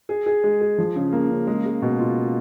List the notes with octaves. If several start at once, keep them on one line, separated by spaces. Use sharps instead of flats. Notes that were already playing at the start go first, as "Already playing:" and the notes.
G#4
G#4
G#3
G#4
F3
C#3
A#3
C#3
G#3
G#3
B2
F4